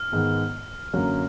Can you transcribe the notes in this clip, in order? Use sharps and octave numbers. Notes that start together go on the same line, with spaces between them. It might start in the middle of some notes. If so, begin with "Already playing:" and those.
Already playing: F6
G#2 D#3 G#3 B3
F#2 D3 F#3 A#3